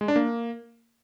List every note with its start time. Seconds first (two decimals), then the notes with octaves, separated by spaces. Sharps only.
0.01 G#3
0.08 D4
0.16 A#3